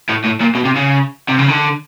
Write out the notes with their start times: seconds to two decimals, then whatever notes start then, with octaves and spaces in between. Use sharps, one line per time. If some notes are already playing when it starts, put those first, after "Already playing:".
0.09 A2
0.24 A2
0.41 A#2
0.55 B2
0.65 C3
0.76 C#3
1.29 C3
1.39 C#3
1.49 D3